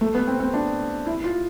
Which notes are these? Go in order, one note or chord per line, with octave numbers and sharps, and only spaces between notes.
A3
B3
C4
C4
D4
E4
F4